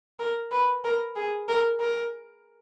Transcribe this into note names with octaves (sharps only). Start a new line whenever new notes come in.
A#4
B4
A#4
G#4
A#4
A#4